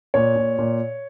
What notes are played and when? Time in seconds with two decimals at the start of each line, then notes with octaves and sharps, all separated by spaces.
0.14 A#2 C#5
0.36 A#2
0.58 A#2